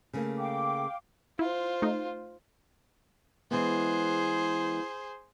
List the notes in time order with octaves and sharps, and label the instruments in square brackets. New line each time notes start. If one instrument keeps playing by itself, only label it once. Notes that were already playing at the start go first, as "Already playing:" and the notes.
[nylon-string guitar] C#3 A3 A#3
[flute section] F5 G5 D6
[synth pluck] E4 [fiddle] F4 C5
[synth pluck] A3 D#4
[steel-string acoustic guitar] E3 G#3 B3 [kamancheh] G#4 C5